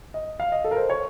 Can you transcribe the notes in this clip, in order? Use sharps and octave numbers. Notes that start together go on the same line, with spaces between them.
D#5
F5
D#5
A4
A#4
C5
C#5